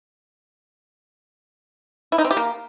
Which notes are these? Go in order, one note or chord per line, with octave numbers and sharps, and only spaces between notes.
E4
D#4
C4
G4
A#3